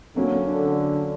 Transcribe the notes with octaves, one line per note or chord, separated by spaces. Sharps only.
D3 F#3 A#3 C#4
D3